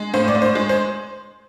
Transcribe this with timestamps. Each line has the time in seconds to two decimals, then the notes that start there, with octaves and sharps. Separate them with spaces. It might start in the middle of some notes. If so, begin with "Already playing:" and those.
Already playing: G#3
0.14 A2 C5
0.28 D5
0.35 A2
0.42 C5
0.55 G#3
0.69 C5